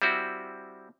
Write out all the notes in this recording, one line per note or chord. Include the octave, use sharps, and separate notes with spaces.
G3 C4 E4 F#4